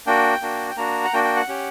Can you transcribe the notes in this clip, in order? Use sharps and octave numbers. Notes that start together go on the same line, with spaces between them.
A#3 D4 F#4 G5
A#3 D4 F#4
G5
A#3 D4 F#4 A#5
F#5
A#3 D4 F#4 G5
G5
F#5
C#4 G4